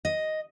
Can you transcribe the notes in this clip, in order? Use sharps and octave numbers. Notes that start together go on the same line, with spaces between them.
D#5